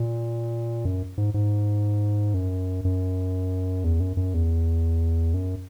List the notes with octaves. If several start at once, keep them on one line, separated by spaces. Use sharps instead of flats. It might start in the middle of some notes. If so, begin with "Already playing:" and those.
Already playing: A#2
F#2
G#2
G#2
F#2
F#2
E2
F#2
F#2
E2
F#2